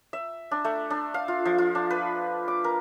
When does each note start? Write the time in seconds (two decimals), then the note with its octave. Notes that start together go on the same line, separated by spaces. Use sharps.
0.13 E5
0.51 D4
0.65 A3
0.90 D4
1.14 F5
1.28 F4
1.45 F3
1.58 F4
1.75 D4
1.90 B4
2.48 D6
2.64 A#4